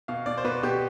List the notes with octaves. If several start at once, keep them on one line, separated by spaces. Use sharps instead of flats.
B2 F5
B2 D5
C5
B2 B4
B2 G4